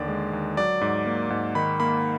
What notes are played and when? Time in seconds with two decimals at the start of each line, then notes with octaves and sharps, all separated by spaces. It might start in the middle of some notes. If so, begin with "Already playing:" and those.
Already playing: D#2 D3 D5
0.08 G#3
0.33 D#2
0.57 F#3 D5
0.81 G#2
1.06 A#3
1.30 G#2
1.55 D#3 B5
1.80 A#3 B5